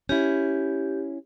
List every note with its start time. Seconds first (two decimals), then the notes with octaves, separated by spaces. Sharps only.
0.09 C#4 E4 G4